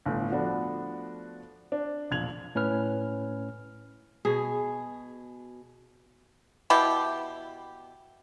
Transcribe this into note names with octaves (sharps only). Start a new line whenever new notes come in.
G1 A2
F3 A3 B3 D4 F#4
D4
E1 A#1 G#6 F7 F#7
A2 C#4 B4 F6
B2 G#4
B2 E4 G4